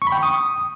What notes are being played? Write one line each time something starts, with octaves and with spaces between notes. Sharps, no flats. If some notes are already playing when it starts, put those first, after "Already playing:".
C#6
B5
G5
C#6
D#6